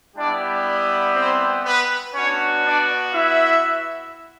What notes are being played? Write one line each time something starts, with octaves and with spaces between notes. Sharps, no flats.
G3 B3 D4 E4 G4 D5
C4 C5
B3 B4
B3 C#4 D4 F#4 C#5
D4 D5
E4 E5